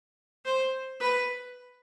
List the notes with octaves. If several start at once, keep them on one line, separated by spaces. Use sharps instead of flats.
C5
B4